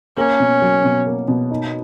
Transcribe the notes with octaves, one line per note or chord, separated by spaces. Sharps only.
A#3 C#4
B2
F#3
B2
A#3
B2
D#4